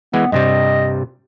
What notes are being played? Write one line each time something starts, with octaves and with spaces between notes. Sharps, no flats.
E3 G#3 B3
G2 C3 G3 D#5